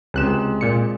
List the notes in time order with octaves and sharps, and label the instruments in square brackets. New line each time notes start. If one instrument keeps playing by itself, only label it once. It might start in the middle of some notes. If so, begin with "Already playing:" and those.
[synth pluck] C#2 F#6 E7 [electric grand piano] C3 G#3
[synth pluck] A#2 C#7